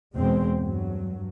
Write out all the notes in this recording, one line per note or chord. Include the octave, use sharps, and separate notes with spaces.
E2 B2 G#3 C4
G2 F#3